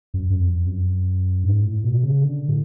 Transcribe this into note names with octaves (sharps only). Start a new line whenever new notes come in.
F#2
F#2
F2
F#2
G#2
A2
B2
C#3
D3
A2